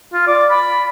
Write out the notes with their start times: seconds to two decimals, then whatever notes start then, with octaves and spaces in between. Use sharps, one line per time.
0.13 F4
0.27 D5
0.50 B5